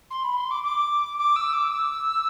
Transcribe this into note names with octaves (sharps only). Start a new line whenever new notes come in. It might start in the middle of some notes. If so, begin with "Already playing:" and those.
C6
B5
C6
D6
D6
D6
E6
D6
E6